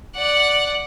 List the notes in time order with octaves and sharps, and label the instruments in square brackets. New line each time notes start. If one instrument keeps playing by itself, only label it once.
[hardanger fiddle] D5 F#5